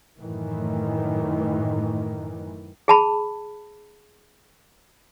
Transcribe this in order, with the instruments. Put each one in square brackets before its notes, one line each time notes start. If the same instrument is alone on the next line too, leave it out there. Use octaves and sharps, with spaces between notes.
[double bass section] F#2 A2 D#3 E3
[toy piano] G#4 A5 B5